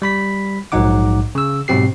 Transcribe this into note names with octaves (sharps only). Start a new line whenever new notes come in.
G3 B5 B6
A#1 G#2 F#3 D#4 F#5 D6
C#3 E6
G#2 B2 F#3 C4 G4 C7